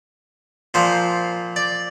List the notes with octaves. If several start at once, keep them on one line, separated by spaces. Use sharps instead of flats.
A#2 F3 C5
D5